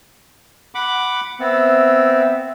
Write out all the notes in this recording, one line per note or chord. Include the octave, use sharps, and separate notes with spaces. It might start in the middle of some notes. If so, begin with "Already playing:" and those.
F#5 B5 D6
B3 C4 E5